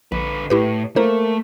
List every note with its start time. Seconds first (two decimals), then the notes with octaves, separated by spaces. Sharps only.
0.12 A#1 D3 B4
0.50 A2 E4 G4 B4
0.96 A3 A#3 C5 A#5